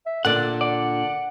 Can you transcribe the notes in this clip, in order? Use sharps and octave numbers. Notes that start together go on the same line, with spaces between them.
E5
A#2 D3 A4 D5 F#5
D5 F#5